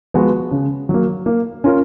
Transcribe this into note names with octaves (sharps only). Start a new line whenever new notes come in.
F3 G#3 B3 F#4
C#3
F#3 A#3
A#3
C#4 F4 A#4